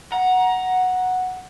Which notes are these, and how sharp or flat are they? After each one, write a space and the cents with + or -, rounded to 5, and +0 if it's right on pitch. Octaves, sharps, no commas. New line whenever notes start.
F#5 -5 A#5 +20